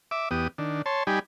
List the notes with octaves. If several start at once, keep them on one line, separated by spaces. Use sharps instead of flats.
E5 D6
E2 B3 G4 D#6
D#3 D4
C#5 A5 C6
G3 D#4 G4 G#5 B5